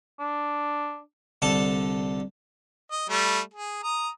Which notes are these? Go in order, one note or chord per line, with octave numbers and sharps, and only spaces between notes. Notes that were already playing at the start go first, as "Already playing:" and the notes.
D4
C2 D3 A4 A5
D#5
G3 A3
G#4
A#5 D#6